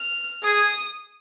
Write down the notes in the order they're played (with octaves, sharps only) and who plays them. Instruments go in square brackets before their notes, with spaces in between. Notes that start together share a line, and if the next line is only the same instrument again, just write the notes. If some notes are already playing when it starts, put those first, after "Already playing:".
Already playing: [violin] F6
[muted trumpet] G#4 [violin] D#6